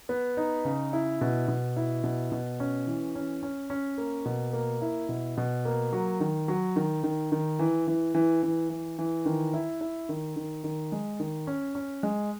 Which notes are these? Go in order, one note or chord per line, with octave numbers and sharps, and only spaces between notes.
B3
D#4
C#3
E4
B2
B2
E4
B2
B2
C#4
E3
C#4
C#4
C#4
A#3
B2
A#3
E4
B2
B2
A#3
F#3
D#3
F#3
D#3
D#3
D#3
E3
E3
E3
E3
E3
E3
D#3
E4
E4
D#3
D#3
D#3
G#3
D#3
C#4
C#4
G#3